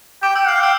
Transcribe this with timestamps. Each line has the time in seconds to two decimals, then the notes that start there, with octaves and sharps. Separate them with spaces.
0.22 G5 D6
0.36 G5 E6
0.48 F5 G6
0.56 F6
0.60 G5 E6